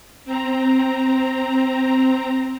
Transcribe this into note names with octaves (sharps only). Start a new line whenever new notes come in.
C4 A#5